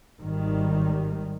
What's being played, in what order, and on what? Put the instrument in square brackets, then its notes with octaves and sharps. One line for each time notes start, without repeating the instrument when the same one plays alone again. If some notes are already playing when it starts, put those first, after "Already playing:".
[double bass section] G#1 D#3 G3